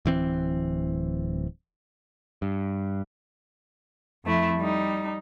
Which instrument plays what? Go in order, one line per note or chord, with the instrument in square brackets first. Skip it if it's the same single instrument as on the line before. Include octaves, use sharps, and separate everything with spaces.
[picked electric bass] D1 E3 C4
G2
[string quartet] F2 A3 E4
G3 D#4